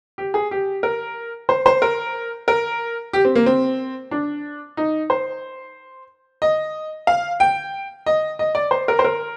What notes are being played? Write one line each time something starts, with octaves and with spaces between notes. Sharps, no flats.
G4
G#4
G4
A#4
C5
C5
A#4
A#4
G4
C4
A#3
C4
D4
D#4
C5
D#5
F5
G5
D#5
D#5
D5
C5
A#4
C5
A#4